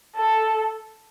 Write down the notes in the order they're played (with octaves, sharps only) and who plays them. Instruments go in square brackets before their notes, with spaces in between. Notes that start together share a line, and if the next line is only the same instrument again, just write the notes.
[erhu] A4